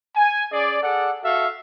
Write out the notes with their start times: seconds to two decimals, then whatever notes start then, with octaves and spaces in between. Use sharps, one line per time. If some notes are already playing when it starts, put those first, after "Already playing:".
0.15 G#5
0.52 C#4 G#4 D5
0.82 G#4 A4 D5 F#5
1.23 F#4 A4 E5 F5